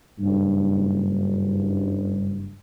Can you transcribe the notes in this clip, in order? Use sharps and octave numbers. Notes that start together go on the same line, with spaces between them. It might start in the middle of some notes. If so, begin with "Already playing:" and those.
F#1 G2